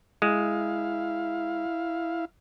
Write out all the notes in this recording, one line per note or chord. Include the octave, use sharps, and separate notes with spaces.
G#3 E4 F5